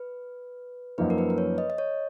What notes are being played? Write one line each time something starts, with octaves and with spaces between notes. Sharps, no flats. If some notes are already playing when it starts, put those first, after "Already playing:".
Already playing: B4
F#2 F3 A#3 D#4 B4
A#4
B4
B4
C#5
D#5
D#5
C#5